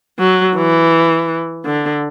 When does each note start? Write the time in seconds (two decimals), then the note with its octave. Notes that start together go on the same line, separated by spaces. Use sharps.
0.19 F#3
0.56 E3
1.65 D3